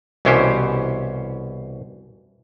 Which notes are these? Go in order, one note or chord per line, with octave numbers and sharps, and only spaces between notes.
C2 B2 E3 C#4 G4 C5